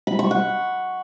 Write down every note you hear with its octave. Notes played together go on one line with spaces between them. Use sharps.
B5
C#6
F#5